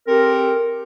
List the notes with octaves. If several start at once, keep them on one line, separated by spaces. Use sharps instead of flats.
C4 G4 A4 A#4